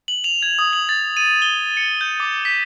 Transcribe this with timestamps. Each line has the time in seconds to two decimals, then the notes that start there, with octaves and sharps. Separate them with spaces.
0.08 F#7
0.24 F7
0.42 G#6
0.59 D#6
0.73 F#7
0.89 A6
1.17 D#7
1.42 G7
1.77 C#7
2.01 G6
2.20 D6
2.45 B6